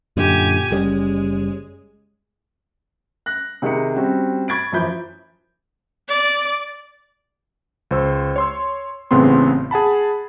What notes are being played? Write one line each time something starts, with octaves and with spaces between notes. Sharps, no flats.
F#2 A#2 D3 G4 G#5
F#1 G3 G#3 C#4
F#6 A#6
C3 D#3 D#4 G#4 B5 C#7
G3 C4 C#4 F#4
B5 C#6 G#6 A6 D7
F#2 E3 F3 B5 G6 D7
D5
C#2 C5 E6
C#5 C6 E6
A1 A2 C#3 B3 C4 C6
G#4 F#5 A5 B5